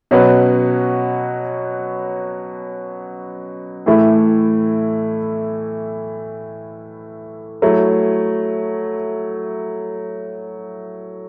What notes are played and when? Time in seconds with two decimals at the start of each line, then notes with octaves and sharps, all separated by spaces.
0.11 B2 F#3 C#4 F#4 B4
3.86 A2 E3 A3 E4
7.62 F#3 A3 E4